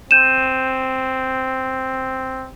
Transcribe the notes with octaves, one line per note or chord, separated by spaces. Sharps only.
C4 G6 D#7 E7